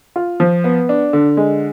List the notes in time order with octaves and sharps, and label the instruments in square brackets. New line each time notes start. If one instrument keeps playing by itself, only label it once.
[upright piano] F4
F3
B3
D4
D3
G#3